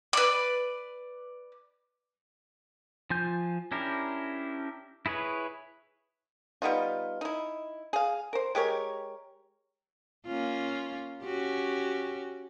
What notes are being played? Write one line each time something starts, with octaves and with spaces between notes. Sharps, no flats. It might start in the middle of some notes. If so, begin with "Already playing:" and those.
B4 D5
F3 F4 G#5 G6
C#4 D4 E4 G4 A#4
E4 G#4 B4 C#5
G3 B3 D#4 F4
D#4 E4
G#4 F5
A#4 C5
G#3 G4 A#4 C#5
A#3 C#4 F4
C#4 F#4 G4